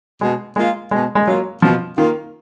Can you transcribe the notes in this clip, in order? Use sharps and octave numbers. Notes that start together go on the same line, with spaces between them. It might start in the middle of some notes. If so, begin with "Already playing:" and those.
B2 G#3
G#3 A#3 F4
B2 G#3
G#3
F#3 A#3 F4
B2 F3
D#3 A#3 F4